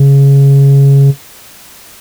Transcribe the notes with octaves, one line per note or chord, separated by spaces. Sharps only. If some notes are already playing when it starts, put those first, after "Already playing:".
Already playing: C#3